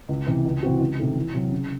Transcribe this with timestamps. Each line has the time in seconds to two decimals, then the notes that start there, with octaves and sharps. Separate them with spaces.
0.09 C#2
0.27 C3 E3
0.45 C#2
0.63 C3 E3 C4 F#4
0.80 C#2
0.99 C3 D#3 A3
1.16 E2
1.34 C3 F#3
1.52 C#3